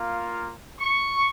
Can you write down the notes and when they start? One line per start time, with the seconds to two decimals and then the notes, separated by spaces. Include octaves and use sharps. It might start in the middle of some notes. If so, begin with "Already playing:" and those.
Already playing: A#3 F4
0.80 C#6